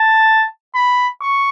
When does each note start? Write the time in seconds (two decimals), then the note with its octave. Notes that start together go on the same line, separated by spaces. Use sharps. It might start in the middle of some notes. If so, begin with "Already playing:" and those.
Already playing: A5
0.75 B5
1.21 C#6